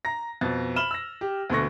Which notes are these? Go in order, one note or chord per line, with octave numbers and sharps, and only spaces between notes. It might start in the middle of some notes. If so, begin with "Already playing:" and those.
A#5 A#6
F2 B2 A6
B5 F6 E7 F#7 G7
E6 A#6
G4
D2 B2 D3 A3 C#6 A#6